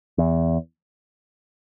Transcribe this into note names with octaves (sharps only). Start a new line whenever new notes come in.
E2